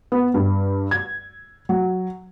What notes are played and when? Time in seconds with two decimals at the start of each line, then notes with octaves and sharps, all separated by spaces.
0.12 B3
0.34 G2
0.91 G#6
1.69 F#3